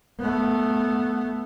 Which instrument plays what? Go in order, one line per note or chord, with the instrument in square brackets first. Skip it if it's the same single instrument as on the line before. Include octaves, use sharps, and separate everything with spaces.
[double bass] A3 B3